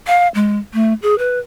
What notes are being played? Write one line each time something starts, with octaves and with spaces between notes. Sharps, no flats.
F5
G#3
A3
G#4
B4